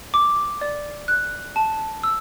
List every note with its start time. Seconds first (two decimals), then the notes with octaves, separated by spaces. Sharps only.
0.14 D6
0.61 D5
1.08 F#6
1.56 A5
2.03 E6